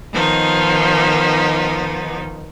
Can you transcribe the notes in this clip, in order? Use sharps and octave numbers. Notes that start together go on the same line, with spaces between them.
D#3 F3 B3 D#4